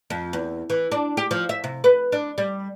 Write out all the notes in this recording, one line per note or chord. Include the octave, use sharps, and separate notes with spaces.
F2
E2
E3
D4
G4
F3
E5
C3
B4
D4
G3